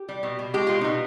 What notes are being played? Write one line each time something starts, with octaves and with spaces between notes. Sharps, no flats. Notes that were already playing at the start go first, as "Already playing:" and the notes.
Already playing: G4
G3
B2
B2
G#3 G4
B2 F4
B2 D#4